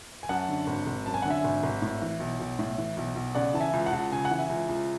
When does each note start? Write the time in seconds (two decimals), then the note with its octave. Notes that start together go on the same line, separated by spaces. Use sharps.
0.23 G#5
0.29 F#2 F#5 A5
0.49 D3
0.67 G#1
0.87 G#1
1.06 F#2 A5
1.14 G#5
1.22 D3 F#5
1.30 E5 G#5
1.44 G#1
1.63 G#1
1.82 A2
2.02 E3
2.20 B1
2.40 B1
2.59 A2
2.78 E3
2.97 B1
3.16 B1
3.35 C#3 D5 F#5
3.54 E3 A5
3.60 E5 G#5
3.73 C#2
3.86 F#5 A5
3.93 C#2
4.12 C#3 G#5
4.25 F#5
4.31 E3
4.38 E5 G#5
4.49 C#2
4.69 C#2